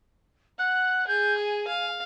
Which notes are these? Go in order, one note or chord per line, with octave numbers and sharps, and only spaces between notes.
F#5 F#6
G#4 G6
G#5
F5